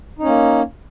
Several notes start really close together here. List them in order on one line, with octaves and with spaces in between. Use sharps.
D#4 C#4 A#3